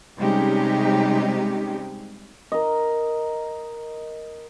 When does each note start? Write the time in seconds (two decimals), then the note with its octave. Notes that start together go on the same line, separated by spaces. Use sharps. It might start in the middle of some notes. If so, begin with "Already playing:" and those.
0.18 C3 G3 G#3 C#4 D#4 G4
2.52 A#4 D#5